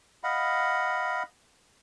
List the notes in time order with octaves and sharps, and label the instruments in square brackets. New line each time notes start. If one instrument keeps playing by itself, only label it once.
[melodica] D#5 F5 F#5 B5